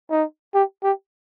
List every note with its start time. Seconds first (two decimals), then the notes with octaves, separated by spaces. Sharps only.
0.10 D#4
0.54 G4
0.83 G4